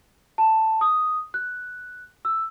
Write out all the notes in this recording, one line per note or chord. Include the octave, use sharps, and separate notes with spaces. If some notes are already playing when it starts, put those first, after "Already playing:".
A5
D#6
F#6
E6